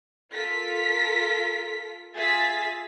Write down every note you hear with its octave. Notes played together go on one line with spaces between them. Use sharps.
F4 A4 A#4 B6
F4 G#4 E5 A6 B6